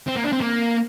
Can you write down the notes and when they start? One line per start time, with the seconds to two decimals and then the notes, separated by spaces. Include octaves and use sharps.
0.08 C4
0.17 A#3
0.24 D4
0.33 C4
0.41 A#3